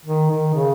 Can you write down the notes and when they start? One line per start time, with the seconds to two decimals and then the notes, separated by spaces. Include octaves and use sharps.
0.05 D#3
0.30 D#3
0.54 C#3